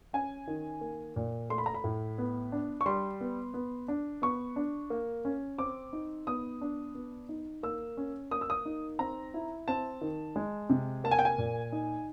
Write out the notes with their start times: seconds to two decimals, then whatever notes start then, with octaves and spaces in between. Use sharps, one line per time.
0.13 C#4 G#5
0.47 D#3
0.81 A#3
1.16 A#2
1.50 A3 C6
1.58 B5
1.66 A#5
1.74 B5
1.84 A2
2.18 B3
2.52 D4
2.81 C#6
2.86 G3 C6
3.21 B3
3.54 B3
3.88 D4
4.22 B3 C#6
4.56 D4
4.90 A#3
5.25 C#4
5.58 C4 D6
5.93 D#4
6.27 B3 D#6
6.61 D4
6.95 B3
7.29 D#4
7.63 A#3 E6
7.97 C#4
8.31 A#3 D#6
8.41 E6
8.50 D#6
8.65 D#4
8.99 C4 A#5
9.34 E4
9.68 C4 A5
10.01 D#3
10.36 G#3
10.70 C3
11.04 A#3 A5
11.11 G#5
11.19 G5
11.25 G#5
11.38 A#2
11.72 D#4